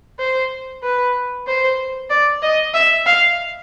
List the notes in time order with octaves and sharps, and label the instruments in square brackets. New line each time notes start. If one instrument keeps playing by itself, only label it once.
[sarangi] C5
B4
C5
D5
D#5
E5
F5